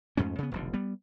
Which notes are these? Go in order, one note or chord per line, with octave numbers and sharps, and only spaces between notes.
F2 G#2 A3 C#4
C#3 B3
F1 B1 D3
G3 B3